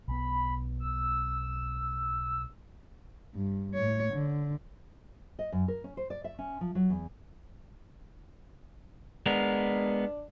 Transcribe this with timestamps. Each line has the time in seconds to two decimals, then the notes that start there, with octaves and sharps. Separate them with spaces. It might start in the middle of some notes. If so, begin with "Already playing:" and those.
0.08 B1 B3 B5
0.80 E6
3.35 G2
3.75 A2 C#5
4.13 D3
5.39 D#5
5.52 F#2
5.68 A#4
5.84 C#4
5.97 C5
6.10 D5
6.24 E5
6.38 C#4
6.61 F3
6.75 F#3
6.90 E2
9.26 G#3 B3 D4 A#4